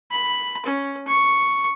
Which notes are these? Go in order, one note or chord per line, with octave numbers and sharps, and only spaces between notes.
B5
C#4
C#6